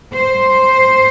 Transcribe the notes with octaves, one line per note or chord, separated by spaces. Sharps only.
C5